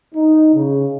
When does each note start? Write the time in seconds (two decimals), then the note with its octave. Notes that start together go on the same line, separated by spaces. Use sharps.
0.14 D#4
0.54 C#3